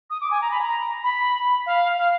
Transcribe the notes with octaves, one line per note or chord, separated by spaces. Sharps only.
D#6
D6
G#5
A#5
B5
A#5
B5
F5
F5